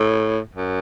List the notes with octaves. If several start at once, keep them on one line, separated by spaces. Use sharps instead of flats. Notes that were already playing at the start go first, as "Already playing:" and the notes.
Already playing: A2
F#2